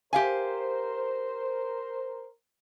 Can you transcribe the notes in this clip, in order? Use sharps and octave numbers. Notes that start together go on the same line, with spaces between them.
G4 A#4 C5 F5 G#5